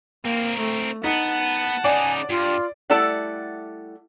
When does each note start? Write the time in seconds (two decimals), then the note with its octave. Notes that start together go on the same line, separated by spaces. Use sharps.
0.25 A#3 C4 A#4
0.59 A3
1.04 B3 D#4 F#5 A5
1.84 C#3 D#4 D5 G#5
2.29 G2 F4
2.90 G3 A3 E4 A4 D5 F#5